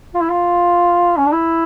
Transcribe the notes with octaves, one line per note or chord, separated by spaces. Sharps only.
F4
E4
F4
C#4
D4
E4